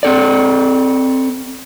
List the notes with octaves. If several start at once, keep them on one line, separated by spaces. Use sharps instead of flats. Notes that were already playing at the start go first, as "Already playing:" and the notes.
C4 A4 D5